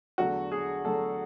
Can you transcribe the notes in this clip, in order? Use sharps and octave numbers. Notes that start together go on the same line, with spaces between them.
E2 D3 F#3 A3 F#4
G#4
E2 D3 F#3 A3 A4